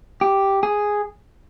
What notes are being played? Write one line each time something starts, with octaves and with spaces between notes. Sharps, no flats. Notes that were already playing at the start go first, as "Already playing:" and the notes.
G4
G#4